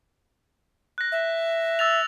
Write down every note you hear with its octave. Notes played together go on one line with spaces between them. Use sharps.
F#6 A#6
E5
E6 A6 F7